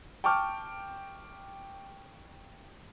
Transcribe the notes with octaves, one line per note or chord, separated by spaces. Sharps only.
G5 A5 C#6 D6 F6